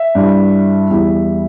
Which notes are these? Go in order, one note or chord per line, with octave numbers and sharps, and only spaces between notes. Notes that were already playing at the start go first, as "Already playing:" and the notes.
Already playing: E5
G2 G3 E4
E2 E3 G3 E4